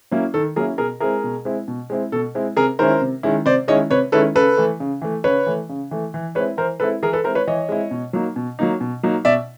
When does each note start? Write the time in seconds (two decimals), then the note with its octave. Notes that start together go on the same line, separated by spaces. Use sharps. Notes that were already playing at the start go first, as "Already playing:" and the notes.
0.11 F#3 A#3 C#4 E4
0.34 D#3 A4
0.56 F#3 A#3 C#4 E4 G#4 A#4
0.78 B2 G#4 A#4
1.00 G#3 C4 E4 G#4 A#4
1.24 B2
1.45 G#3 C4 E4
1.68 B2
1.90 G#3 C4 E4
2.12 B2 A4
2.35 G#3 C4 E4
2.57 C3 G#4 A#4
2.79 D#3 G#3 C#4 E4 A#4 C5
3.01 C3
3.23 D#3 G#3 C#4 E4
3.45 C3 C5 D5
3.68 D#3 G#3 C#4 E4 C#5 D#5
3.90 C3 B4 C#5
4.12 D#3 G#3 C#4 E4 A4 B4
4.35 C#3 A4 B4
4.57 E3 A3
4.80 C#3
5.02 E3 A3
5.24 C#3 B4 C#5
5.46 E3 A3
5.69 C#3
5.91 E3 A3
6.14 E3
6.35 G#3 C4 E4 B4 C#5
6.57 E3 A#4 C5
6.80 G#3 C4 E4 A4 B4
7.03 E3 G#4 A#4
7.13 A4 B4
7.24 G#3 C4 E4 A#4 C5
7.35 B4 C#5
7.47 E3 C#5 D#5
7.69 G#3 C4 E4
7.91 B2
8.13 F#3 A#3 D#4
8.36 B2
8.59 F#3 A#3 D#4
8.81 B2
9.03 F#3 A#3 D#4
9.25 B2 D5 E5